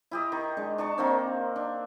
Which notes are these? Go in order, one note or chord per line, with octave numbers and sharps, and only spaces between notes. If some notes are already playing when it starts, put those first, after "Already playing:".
E4 G4 D#5
D#3
G#3 D4
D4 D5 A5 C#6
D#3 A#3 C4
D4